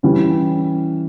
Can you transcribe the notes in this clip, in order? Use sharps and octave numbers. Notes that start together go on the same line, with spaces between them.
E3 G3 C#4